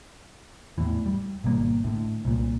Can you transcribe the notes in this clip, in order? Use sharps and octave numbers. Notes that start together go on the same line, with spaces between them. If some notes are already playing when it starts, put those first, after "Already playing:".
E2 A2 E3
G3
G#1 B2 G3 A#3
A2 D3
C2 A#2